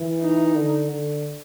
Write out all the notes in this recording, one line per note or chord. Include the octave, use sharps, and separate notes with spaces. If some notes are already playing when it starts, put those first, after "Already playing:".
Already playing: E3
D#4
D3
D3